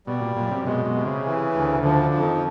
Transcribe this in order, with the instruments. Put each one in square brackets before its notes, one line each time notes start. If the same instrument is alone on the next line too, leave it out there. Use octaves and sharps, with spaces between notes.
[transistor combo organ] B2 [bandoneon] G3
[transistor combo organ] A#2
[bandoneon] F#2 [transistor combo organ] A#2
[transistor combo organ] C3
[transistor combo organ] B2 [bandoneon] G#3
[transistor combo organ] B2
[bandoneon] C3
[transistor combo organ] C#3
[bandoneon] E3
D2
[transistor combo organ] D3 [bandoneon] F3
[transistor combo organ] D3
[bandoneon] F2
[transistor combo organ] D#3